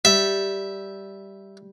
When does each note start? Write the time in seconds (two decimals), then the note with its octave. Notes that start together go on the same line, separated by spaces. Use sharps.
0.05 G3 E5